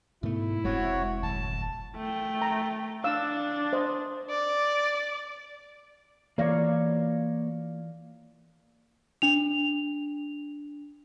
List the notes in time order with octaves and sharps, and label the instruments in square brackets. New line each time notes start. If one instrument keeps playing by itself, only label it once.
[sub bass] G#2 [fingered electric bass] B2 A3 [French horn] E4
[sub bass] F1 [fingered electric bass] G#3 C4 [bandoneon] F#4 C#5
[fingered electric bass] D1 [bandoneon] A5
[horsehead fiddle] A3 G5
[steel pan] A#5
[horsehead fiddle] D4 [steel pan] F5 E6
[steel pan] C5 D#5
[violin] D5
[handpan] E3 D5 F5 [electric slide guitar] A#3 A#4 C#5
[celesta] D4 F7